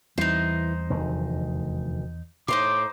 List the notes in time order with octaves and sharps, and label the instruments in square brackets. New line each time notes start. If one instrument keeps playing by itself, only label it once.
[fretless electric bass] E2 G3 C4 [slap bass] E3 [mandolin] D#4 C5
[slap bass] F1 D2 D#3
[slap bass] A2 [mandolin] D#4 C5 C6 [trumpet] D6